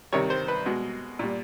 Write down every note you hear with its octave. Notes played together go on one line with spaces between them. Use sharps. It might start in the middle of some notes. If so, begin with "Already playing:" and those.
C3 D#3 G3 C#5
C5
B4
B2 G#3
A#2 G3